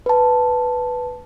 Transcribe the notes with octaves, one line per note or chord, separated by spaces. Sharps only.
B4 A5